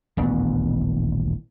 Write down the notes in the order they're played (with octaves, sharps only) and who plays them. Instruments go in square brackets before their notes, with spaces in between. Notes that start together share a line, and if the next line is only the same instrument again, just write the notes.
[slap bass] D#1 A1 D2 B3